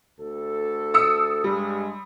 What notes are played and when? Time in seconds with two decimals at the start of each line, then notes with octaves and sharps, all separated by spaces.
0.19 D2 A4
0.94 D#6 E6 C#7
1.44 G2 G3 G#3